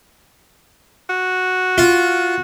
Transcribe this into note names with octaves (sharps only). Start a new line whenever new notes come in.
F#4
F4